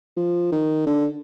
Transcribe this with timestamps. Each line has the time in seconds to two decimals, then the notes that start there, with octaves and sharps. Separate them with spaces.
0.17 F3
0.52 D#3
0.87 D3